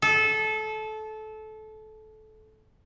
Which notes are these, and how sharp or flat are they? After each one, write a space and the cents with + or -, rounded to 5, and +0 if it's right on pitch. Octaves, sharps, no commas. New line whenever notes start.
A4 -20